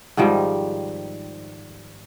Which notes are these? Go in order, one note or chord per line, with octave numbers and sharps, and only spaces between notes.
G#2 D#3 F3 G3